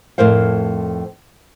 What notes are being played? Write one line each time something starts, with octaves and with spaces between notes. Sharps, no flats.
F2 A2 A#4 C5 F5